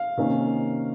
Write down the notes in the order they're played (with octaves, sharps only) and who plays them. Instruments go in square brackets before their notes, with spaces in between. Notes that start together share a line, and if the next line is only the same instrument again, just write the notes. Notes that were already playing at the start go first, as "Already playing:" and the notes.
Already playing: [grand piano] F5
C3 D#3 A#3 C#4